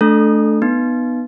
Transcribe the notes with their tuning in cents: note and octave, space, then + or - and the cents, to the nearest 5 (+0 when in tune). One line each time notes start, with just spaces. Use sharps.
A3 -15 D4 +0 A4 +0
B3 +0 D#4 -25